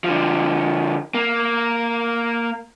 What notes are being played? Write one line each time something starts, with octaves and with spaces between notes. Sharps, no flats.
D3 F3
A#3